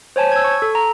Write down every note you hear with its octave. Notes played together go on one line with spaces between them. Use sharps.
C5 C#5 G#5 A5
E6 G#6
C#6
A4
A#5